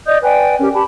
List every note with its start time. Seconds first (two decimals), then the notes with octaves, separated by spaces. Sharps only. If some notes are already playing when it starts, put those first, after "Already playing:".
0.06 D5 D#5 D#6 G6
0.22 B4 D5 G5 G#5
0.60 C#4 G4 A#4
0.74 G4 A5 B5